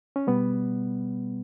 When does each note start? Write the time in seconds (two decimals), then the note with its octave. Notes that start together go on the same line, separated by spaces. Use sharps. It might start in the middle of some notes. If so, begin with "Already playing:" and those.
0.16 C#4
0.27 B2 G3 B3